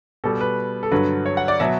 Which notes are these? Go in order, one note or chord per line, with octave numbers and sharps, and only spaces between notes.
B2 G3 A4
B4
A4
G2 D3 F#3 B4
C#5
F#5
D5
B2 F#3 E5